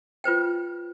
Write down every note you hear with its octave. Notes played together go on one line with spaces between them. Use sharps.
F4 B4 C5 G5